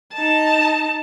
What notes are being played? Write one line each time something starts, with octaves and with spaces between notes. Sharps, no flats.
D#4 A5